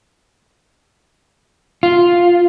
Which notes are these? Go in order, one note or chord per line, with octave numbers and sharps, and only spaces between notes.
F4